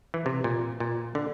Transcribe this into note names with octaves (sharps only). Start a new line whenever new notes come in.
E3
C3
A#2
A#2
D3